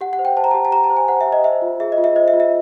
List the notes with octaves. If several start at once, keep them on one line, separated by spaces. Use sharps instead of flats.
G4 F#5
F#5
C5
G5
C5 A5
A#5
G4 A5
A5
G4 A#5
A5
C5
G#5
C5 F#5
E5
G4
D#5
C5 E5
F4
G#4 E5
D#5
F4
E5
C5 D#5
E5
F4
E5